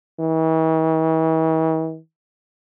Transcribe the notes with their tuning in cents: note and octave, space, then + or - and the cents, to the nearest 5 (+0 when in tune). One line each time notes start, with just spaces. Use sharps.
E3 -45